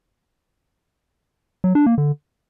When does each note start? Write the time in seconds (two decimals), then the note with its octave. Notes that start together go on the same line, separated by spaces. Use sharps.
1.64 F#3
1.75 D4
1.86 A#3
1.98 D3